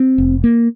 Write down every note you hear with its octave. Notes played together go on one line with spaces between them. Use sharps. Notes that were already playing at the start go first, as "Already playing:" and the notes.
Already playing: C4
F1
A#3